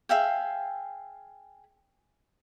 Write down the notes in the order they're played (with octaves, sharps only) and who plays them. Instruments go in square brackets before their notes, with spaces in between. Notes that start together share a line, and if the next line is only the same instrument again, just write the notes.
[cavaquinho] G#4 E5 F5 G5